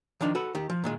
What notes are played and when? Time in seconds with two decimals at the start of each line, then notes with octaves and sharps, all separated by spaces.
0.21 D#3 F3 D4 D#4
0.35 F#4 A4 B4
0.55 D#3 G4
0.70 F3
0.84 A#2 D#3 G#3